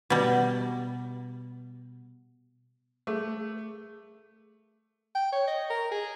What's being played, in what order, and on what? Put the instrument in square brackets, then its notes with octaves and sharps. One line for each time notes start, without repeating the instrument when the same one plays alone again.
[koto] B2 G3
[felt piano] A3 [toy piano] G#4 A#4
[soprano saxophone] G5
C#5
D#5
A#4
G#4